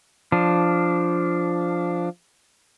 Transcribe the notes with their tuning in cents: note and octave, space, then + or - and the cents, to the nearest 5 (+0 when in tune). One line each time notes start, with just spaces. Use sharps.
F3 +0 D4 +0